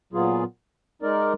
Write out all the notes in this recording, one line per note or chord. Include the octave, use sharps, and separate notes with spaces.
A#2 F#3 B3 F4 G#4
G#3 D#4 A#4 D5